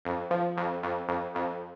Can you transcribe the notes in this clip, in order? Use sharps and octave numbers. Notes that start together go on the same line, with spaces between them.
F2
F3
F2
F2
F2
F2